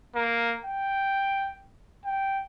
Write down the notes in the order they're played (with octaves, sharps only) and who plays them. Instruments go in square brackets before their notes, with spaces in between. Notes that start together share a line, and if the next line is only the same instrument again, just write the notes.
[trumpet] A#3
G5
G5